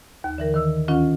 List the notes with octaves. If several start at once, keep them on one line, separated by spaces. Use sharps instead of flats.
D#2
D3 E3 A#4
D#3 E6
D2 D#3 C#4 F4